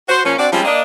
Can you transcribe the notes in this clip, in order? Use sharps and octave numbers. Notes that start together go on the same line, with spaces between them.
F#4 C5
A#2 F3 A#3 C#4
C4 D4 F#4 D5
F3 G3 G#3 C4 C#4 F4
A#3 D4 D#5